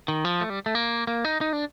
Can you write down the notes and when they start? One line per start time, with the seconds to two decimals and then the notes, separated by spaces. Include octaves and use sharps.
0.08 D#3
0.25 F3
0.41 A3
0.50 G3
0.66 A3
0.75 A#3
1.07 A#3
1.24 D#4
1.41 D#4
1.53 D4